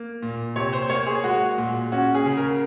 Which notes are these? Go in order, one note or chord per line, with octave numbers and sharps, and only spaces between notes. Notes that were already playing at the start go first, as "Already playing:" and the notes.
Already playing: A#3
A#2
C3 C#5
C5
A#3 C#5
G#4
G#3 F#4
A#2
C#4 F#4
G#4
C#3
A#4